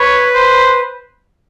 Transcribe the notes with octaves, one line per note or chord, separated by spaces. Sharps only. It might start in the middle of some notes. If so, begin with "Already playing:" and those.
Already playing: B4 C#5
C5